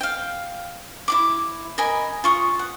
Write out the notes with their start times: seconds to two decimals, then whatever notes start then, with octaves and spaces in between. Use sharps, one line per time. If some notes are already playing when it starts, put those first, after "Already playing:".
0.01 F5 G5
1.08 E4 F4 D6
1.78 A#4 D#5 G#5 B5
2.24 F4 C#6 D#6
2.59 F#5